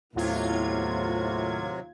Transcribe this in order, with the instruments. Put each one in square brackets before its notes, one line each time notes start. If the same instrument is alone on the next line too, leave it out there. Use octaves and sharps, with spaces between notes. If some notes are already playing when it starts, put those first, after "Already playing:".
[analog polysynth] D#2 F4 G#6 [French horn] A2 [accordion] C3 F#3 [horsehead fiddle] B3 E4